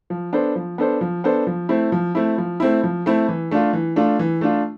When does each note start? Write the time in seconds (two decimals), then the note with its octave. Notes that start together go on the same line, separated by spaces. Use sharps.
0.10 F3
0.33 B3 D4 A4 C5
0.56 F3
0.78 B3 D4 A4 C5
1.01 F3
1.24 B3 D4 A4 C5
1.47 F3
1.69 A3 C4 E4
1.92 F3
2.15 A3 C4 E4
2.38 F3
2.60 A3 C4 E4
2.83 F3
3.06 A3 C4 E4
3.28 E3
3.51 A3 D4 F4
3.73 E3
3.96 A3 D4 F4
4.19 E3
4.41 A3 D4 F4